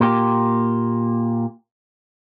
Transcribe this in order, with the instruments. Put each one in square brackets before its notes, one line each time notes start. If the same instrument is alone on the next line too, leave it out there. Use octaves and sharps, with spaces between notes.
[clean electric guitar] A#2 A#3 G4